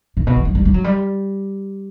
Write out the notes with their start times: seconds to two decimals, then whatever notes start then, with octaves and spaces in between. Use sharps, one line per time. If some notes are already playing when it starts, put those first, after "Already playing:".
0.17 A#2
0.27 B2
0.36 F3
0.45 F#3
0.55 G3
0.65 G3
0.74 F#3
0.84 G3